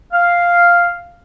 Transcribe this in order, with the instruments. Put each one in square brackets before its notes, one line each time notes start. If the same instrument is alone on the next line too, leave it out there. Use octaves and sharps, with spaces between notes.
[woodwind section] F5